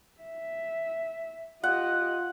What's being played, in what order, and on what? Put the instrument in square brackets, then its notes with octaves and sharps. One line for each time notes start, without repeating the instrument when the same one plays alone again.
[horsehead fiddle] E5
[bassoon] F4 [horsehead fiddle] G4 D#5 [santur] F#5